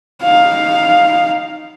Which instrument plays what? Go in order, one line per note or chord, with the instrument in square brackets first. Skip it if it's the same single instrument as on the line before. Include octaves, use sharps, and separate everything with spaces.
[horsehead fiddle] D#4 F5